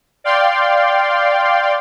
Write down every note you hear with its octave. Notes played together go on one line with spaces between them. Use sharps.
D5 F5 G5 C6